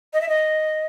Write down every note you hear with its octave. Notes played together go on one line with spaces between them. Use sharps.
D#5
E5
D#5